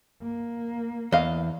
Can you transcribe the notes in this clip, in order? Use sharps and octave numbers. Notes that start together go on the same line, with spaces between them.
A#3
E2 D#5 F5